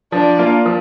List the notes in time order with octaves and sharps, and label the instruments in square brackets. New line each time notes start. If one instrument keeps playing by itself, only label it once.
[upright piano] F3 [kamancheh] D4
[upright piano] A#3 F4
F3